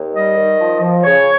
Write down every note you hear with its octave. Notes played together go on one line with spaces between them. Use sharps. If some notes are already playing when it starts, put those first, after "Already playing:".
Already playing: D#2
G3 D#5
D#3
F3
F3
C#3 C#5